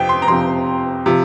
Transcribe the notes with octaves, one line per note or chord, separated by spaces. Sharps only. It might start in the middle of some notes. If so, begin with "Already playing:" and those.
Already playing: F2 C3 F3 G5
C6
A#5
F2 C3 F3 C6
C3 F3